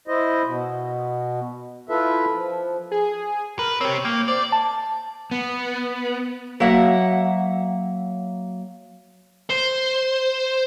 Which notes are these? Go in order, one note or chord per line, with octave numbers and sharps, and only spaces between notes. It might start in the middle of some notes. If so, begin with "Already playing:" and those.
E4 C5 D#5
B2
E4 F4 A4 B4 E5
F3
G#4
A#4 B4
C4 G4 C#5
A#3 G5
C5 D5
A5
B3
F#3 A#3 E5 F#5
C5